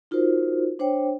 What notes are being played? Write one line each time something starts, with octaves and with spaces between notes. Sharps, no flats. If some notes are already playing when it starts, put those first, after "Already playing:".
D#4 F4 F#4 A#4 C5
D4 C5 C#5 G5